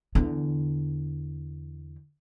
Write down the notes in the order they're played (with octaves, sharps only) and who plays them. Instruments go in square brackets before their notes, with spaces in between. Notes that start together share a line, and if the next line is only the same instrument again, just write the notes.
[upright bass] E2 D3